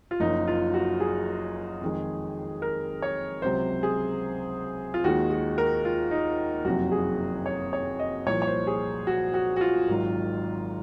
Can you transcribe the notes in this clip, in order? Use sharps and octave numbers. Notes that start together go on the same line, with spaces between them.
F4
F#1 F#2 F3 D#4
F4
F#4
G#4
F2 D#3 G#3
A#4
C#5
C#2 C3 F#3 C5
G#4
F4
D#2 D#3 G#3 F#4
F#4
A#4
F4
D#4
F#1 F2 C3 F#3 F#4
G#4
C#5
C#5
D#5
C2 A#2 F3 C#5
C#5
C5
G#4
F#4
F#4
F#4
F4
G#1 G#2 D#3 F#3